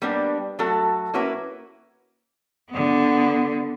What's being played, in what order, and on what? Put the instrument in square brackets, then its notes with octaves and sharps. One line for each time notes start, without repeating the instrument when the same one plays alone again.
[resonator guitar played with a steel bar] G3 A#3 B3 D4 G4
F#3 A3 F#4 A4
A#3 C#4 E4 F#4 A#4 B4
[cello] D3 B3